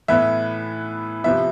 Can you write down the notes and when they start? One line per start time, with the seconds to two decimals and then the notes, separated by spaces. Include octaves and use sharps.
0.08 A2 E3 B3 E5
1.24 C3 F3 B3 E5